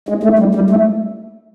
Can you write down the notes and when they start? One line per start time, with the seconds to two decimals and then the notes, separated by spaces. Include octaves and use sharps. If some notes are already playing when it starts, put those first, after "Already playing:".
0.09 G#3
0.23 A3
0.39 G3
0.55 G3
0.70 A3